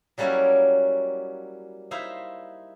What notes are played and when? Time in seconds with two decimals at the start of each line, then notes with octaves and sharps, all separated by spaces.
0.18 F#3 G3 A#3 C#4 E4 F#4
1.91 D#4 E4 C5 E5 F5